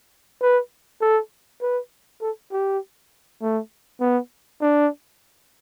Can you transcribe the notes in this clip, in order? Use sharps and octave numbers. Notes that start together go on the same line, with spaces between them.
B4
A4
B4
A4
G4
A3
B3
D4